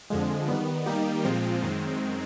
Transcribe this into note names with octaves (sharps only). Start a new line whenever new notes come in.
F2 D3 F3 G#3
D#3 G3 B3
D#3 G3 A#3 D#4 G4
A#2 F3 G#3 C4 F4
F#2 D#3 G#3 C4